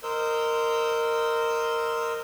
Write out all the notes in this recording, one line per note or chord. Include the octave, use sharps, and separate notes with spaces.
A#4 C5 D#5 E6 G6